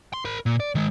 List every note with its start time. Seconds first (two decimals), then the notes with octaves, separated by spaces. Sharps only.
0.13 C6
0.25 A#4 B5
0.46 A#2
0.60 D5
0.75 D#3 G#3